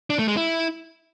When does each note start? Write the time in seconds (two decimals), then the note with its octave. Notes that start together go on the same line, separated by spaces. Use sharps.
0.10 D4
0.19 A3
0.28 G#3
0.37 E4